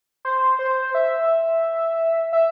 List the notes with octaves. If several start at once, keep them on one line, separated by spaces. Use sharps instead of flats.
C5
C5
E5
E5